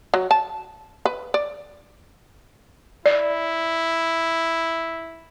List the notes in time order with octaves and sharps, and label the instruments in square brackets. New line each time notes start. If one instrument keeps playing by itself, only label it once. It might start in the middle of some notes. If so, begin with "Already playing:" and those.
[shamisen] F#3
A5
B4
D5
[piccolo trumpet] E4 [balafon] D5